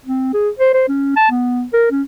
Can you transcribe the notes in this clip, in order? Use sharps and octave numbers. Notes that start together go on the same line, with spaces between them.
C4
G#4
C5
C5
C#4
A5
B3
A#4
C#4